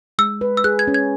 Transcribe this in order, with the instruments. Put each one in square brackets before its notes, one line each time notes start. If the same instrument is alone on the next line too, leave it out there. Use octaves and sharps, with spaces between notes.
[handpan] G#3 [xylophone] E6
[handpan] B4
[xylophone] E6
[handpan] G#4 [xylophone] F#6
[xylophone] G#6
[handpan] C#4
[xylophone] G#6